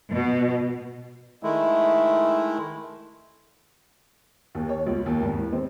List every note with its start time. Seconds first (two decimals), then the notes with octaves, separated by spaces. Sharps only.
0.13 B2
1.43 D#3 G#3 A3 E4
4.55 D#2
4.69 C#5
4.87 C#2
5.06 D#2
5.22 G#1
5.38 E3
5.53 C4